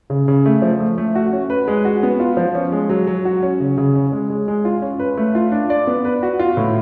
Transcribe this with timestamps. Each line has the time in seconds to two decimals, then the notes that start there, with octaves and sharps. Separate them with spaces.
0.10 C#3
0.28 C#3
0.46 A3
0.62 F3
0.80 A3
0.98 A3
1.15 F#4
1.33 C#4
1.50 B4
1.68 G#3
1.85 F#4
2.03 B3
2.20 F4
2.37 F3
2.55 C#4
2.72 G#3
2.89 F#3
3.07 F#3
3.25 F#4
3.42 C#4
3.60 C#3
3.78 C#3
3.96 C#4
4.12 G#3
4.30 G#3
4.48 G#3
4.65 F4
4.82 C#4
4.99 B4
5.17 A3
5.35 F4
5.52 D4
5.70 D5
5.87 B3
6.05 B4
6.23 F#4
6.39 F4
6.57 A2